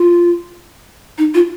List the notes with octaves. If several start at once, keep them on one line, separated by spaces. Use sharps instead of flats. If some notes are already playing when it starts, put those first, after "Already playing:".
Already playing: F4
D#4
F4